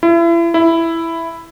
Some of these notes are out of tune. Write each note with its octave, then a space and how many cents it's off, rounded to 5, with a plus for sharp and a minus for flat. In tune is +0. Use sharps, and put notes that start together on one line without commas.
E4 +35
E4 +5